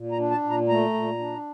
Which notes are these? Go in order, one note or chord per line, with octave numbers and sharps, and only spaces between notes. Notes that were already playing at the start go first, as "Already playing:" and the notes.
Already playing: A#2
A#5
D4
A5
A#2
A#5
A3 A#5
A#2
D4